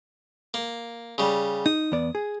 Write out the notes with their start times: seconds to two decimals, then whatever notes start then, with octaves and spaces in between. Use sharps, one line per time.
0.54 A#3
1.18 C#3 G3
1.66 D#4 D#6
1.92 E2 B3 D5
2.15 G#4